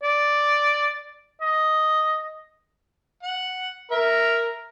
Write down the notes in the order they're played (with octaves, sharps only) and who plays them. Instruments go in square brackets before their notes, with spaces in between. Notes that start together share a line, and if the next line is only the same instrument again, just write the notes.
[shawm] D5
D#5
[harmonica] F#5
[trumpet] A#4 [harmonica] E5